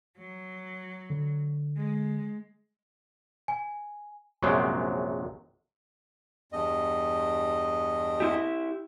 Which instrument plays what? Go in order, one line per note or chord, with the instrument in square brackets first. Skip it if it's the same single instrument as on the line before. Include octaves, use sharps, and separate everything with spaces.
[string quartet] F#3
[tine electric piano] D3
[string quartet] G#3
[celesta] G#5
[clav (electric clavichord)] A#1 F#2 C3 F#3 G#3 G5
[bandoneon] E2 G2 D#5
[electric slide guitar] E4 G4